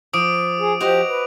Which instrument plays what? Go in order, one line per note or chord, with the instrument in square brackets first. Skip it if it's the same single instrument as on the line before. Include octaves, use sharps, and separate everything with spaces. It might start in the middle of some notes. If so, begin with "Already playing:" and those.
[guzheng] F3 [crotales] D6 D#6 D7
[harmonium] G#4
[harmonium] F3 G4 [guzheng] F#4 C5 D#5 [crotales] F7
[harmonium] B4